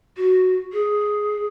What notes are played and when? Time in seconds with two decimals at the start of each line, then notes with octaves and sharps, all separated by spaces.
0.17 F#4
0.73 G#4